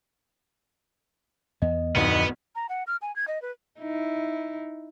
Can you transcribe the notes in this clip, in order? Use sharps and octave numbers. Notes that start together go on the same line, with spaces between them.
E2 B3 D#5
D1 F2 B3 D#4 B4
A#5
F#5
F6
G#5
G#6
D#5
B4
D#4 E4